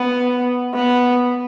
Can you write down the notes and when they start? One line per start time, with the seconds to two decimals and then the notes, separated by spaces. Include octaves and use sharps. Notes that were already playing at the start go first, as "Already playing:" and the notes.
Already playing: B3
0.74 B3